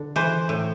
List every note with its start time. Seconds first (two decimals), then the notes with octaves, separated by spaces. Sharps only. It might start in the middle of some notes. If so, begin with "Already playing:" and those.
Already playing: D3
0.16 E3 C5
0.49 A2